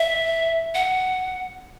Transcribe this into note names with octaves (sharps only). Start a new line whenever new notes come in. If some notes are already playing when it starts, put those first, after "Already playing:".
Already playing: E5
F#5